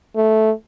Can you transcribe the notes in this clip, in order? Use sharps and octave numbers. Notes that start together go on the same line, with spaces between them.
A3